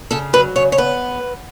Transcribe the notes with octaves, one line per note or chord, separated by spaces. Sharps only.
C#3 A4
F#3 B4
C#3 C#5
C#5
B3 B4